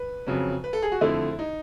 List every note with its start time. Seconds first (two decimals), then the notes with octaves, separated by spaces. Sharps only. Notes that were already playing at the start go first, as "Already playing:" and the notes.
Already playing: B4
0.26 F2 C#3 F#3
0.64 B4
0.73 A4
0.82 G#4
0.92 F#4
1.01 F2 D3 F3 A3 E4
1.39 D#4